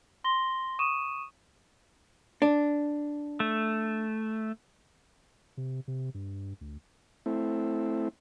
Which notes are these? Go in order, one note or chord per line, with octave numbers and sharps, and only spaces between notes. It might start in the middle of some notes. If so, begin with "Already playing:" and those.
C6 A#6 G7
C#6 D#6 D#7 E7
D4
A3
C3
C3
G2
D2
A3 C4 E4